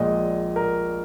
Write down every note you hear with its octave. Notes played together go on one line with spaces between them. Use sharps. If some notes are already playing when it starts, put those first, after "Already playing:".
Already playing: A#1 A#2 G#3 D#5
A#4